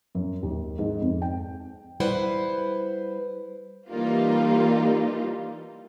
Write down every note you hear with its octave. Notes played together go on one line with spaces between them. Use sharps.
F#2
D#2
G#2
F2
G5
G3 E4 B4 C5 F#5
E3 G3 A#3 D#4 F4